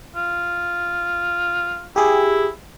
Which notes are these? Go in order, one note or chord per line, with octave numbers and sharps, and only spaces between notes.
F4
E4 G4 G#4